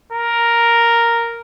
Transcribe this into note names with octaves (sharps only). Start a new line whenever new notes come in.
A#4